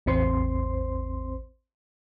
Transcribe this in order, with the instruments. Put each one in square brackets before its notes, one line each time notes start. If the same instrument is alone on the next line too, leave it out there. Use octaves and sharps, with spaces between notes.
[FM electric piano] A1 E2 C4 C5 C6